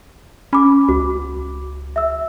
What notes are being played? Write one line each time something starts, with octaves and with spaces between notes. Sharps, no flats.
C#4 B5 D6
C#2 F#4
E5 E6